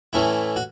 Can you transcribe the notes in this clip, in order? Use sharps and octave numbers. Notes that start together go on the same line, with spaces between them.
A2 E3 A3 C#4 E4
F#4